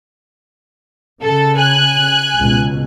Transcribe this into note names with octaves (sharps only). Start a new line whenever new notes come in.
C#3 A4
G#5 F#6
C#2 B2